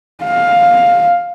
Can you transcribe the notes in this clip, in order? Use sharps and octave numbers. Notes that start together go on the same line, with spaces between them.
F5